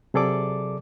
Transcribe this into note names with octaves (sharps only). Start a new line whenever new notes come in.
C3 F#3 G#4 A4 D5 D6